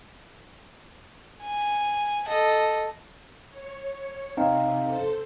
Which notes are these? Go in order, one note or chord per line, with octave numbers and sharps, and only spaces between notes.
G#5
A4 D#5
C#5
C3 C4 D#4 F5
A4 C5